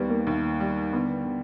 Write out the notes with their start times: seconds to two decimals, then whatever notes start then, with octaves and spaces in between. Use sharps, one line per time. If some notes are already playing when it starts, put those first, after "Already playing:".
Already playing: D#2 G3 B3
0.10 A#3
0.27 D#2
0.60 G3
0.92 D3 B3
1.25 D3